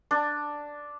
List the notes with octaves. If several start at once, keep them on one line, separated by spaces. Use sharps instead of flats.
D4